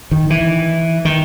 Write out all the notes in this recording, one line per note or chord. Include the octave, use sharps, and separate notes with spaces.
D#3
E3
D#3